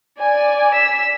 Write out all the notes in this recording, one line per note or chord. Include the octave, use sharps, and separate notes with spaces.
D5 G#5
E6 B6